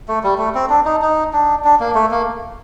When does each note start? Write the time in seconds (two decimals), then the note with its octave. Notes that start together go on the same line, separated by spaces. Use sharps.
0.08 A3
0.23 G3
0.38 A3
0.55 C4
0.69 D4
0.85 D#4
1.02 D#4
1.33 D4
1.64 D4
1.80 A#3
1.95 A3
2.11 A#3